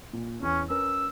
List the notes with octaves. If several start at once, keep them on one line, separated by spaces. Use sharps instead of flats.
A#2
E2 C#4 C#5
C#4 A#4 B4 E6